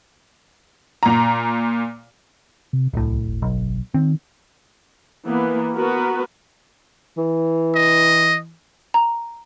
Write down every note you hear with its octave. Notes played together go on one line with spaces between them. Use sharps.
A#2 A#5
C3
D1 C2 A2
G1
B1
D#3 C4
E3 A#3 B3
B3 F#4 A#4 B4
E3
D#5
A#5